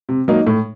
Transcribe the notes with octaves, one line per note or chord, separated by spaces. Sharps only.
C3
F#3 A#3 D#4
A2